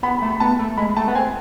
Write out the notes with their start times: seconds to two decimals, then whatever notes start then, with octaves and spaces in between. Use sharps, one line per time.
0.03 B3 B5
0.18 B5
0.22 A3
0.30 B5
0.40 B3 A5
0.59 A3
0.78 G#3 B5
0.96 A3 A5
1.08 B3
1.15 C4 G#5